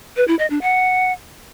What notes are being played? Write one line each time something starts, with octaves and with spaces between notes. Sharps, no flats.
B4
E4
D#5
D4
F#5